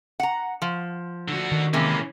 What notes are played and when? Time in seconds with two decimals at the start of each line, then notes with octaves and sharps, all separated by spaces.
0.20 F#5 A#5
0.62 F3
1.28 D3 F#4
1.52 D#3
1.73 C3 E3 G#3 A#3 C#4